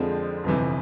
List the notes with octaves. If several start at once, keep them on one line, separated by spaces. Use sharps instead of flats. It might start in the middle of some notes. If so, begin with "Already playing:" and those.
Already playing: F2 D3 F3 G#3 C4
G1 F2 C3 E3